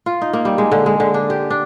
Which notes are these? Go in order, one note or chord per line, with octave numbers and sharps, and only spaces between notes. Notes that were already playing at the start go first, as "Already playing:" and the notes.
F4
D#4
A#3
G3
G#3
D3
G#3
D3
D4
G4
D4